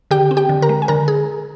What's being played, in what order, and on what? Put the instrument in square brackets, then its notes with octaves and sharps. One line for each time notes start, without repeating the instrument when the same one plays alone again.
[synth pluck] D3 G4 G5
C4
G4 G5
D3
A#4 A#5
G#3
G#5
D3 A#4 A#5
G#4